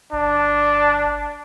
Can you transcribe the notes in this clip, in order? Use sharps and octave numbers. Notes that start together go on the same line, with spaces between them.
G1 D4